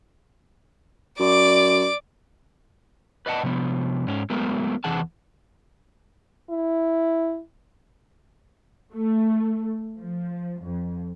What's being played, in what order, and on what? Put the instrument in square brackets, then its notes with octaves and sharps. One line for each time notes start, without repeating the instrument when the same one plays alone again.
[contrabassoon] F#2 [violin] D5 D6
[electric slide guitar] B4 D5 D#5 F#5 A5
C3 F3 B3
G#2 C#4
F#3 G#3 A3 B3 A#4
E2 C3 E3 G#4 F#5 A5
[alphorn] E4
[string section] A3
F3
F2